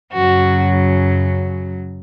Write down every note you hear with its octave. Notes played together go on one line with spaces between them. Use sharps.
F#2 C#3 F#3 F#4